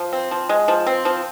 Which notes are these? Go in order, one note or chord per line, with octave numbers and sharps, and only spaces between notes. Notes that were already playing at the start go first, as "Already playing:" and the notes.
Already playing: F3
C4
F3
G#3
F3
C4
F3